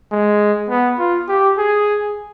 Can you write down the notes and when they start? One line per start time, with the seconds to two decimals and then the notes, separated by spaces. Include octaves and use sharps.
0.12 G#3
0.69 B3
0.99 F4
1.28 G4
1.58 G#4